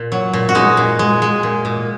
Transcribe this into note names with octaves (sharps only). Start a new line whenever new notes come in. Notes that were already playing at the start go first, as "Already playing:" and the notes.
Already playing: A#2
F#3
A#2
F#4
G#3 D#4
A#2
G#3
G#3
A#2
A#2